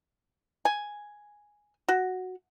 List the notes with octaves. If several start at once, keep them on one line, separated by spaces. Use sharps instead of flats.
G#5
F#4